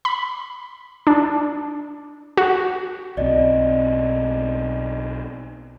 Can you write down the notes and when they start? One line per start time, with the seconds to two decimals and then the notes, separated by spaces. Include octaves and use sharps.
0.05 B5
1.07 D4
2.37 F#4
3.17 B1 B2 C4 D5 D#5